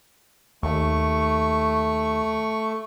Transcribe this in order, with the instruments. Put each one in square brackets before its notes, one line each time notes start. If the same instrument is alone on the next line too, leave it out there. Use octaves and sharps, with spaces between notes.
[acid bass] D#2 [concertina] A3 C#6